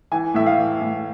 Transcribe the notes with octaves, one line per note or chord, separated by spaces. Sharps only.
E3 G#5
A2 E5
F5
E3
A2